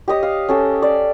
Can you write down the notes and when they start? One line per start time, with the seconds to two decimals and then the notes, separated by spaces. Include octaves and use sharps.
0.08 G4 C#5 D#5 D#6
0.23 F5
0.49 C#4 A4 G5
0.82 D5